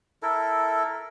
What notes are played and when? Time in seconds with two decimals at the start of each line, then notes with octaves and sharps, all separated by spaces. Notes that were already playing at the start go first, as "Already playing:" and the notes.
0.23 E4 A4 A#4